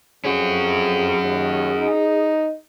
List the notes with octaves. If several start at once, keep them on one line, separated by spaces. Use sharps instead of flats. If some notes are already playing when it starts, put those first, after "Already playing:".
F2 C#4 F#4 G#4
D#2
D#4